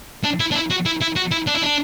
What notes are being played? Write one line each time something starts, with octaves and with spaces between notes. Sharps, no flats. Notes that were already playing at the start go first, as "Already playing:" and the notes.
D4
E4
D4
E4
F#4
E4
E4
F#4
E4
D4
E4
D4